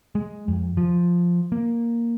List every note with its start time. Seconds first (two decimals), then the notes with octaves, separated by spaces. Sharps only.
0.15 G#3
0.48 F2
0.77 F3
1.52 A#3